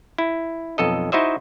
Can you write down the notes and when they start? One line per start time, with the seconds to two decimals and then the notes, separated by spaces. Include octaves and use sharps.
0.18 E4
0.78 B1 F2 A4 D#5
1.12 D#4 E4 F#4 C5 D#5 E5